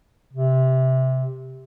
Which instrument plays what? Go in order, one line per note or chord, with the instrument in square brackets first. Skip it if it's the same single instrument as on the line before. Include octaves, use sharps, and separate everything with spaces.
[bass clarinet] C3